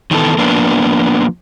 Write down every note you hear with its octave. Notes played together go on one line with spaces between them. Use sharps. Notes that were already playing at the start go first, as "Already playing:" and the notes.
D#3 E3 B3 A4
F3 A#3 B3 D4